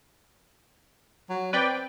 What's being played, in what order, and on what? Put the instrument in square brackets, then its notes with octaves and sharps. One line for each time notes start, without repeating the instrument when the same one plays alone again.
[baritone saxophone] F#3
[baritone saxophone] C4 [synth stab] B4 D5 G5